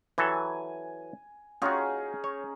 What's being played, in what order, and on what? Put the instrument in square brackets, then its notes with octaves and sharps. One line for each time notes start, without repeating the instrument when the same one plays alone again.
[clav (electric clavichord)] E3 F#3 A4 [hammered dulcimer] G#5
[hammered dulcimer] C#4 D#4 G#4 [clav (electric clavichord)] F4 F#4
[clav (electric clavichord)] C#5